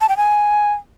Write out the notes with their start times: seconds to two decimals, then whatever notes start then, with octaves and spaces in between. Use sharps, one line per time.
0.01 A5
0.09 G5
0.17 G#5